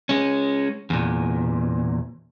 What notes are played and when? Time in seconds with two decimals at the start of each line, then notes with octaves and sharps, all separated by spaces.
0.09 G#3 C#4
0.90 E2 A#2